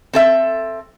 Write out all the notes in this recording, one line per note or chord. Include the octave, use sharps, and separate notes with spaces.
C4 A4 E5